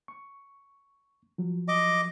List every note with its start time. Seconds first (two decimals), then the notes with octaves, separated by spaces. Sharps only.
0.08 C#6
1.38 F3 F#3
1.68 D#5 D6